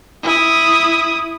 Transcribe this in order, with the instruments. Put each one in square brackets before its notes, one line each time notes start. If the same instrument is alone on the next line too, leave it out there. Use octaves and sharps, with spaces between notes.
[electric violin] E4 D#6